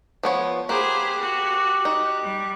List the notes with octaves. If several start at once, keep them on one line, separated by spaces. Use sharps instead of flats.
F3 B3 C#5
A#3 G4 G#4 C5 B5 F#6
F#4
D#4
G3